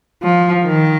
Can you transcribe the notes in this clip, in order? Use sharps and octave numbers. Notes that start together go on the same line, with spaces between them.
F3
D#3